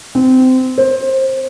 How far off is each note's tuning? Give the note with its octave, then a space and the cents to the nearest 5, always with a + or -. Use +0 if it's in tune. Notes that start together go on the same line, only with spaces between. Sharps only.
C4 -20
C5 +20